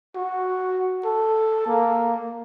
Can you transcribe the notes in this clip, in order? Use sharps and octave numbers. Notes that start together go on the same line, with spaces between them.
F#4
A4
A#3